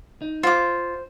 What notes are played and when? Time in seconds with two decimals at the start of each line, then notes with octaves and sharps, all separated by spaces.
0.22 D#4
0.43 F4 C5 D6